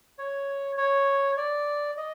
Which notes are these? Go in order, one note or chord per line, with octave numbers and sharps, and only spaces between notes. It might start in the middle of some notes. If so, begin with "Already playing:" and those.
C#5
C#5
D5
D#5